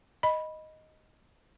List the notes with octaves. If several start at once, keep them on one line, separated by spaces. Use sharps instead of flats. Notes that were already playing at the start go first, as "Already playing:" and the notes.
D#5 B5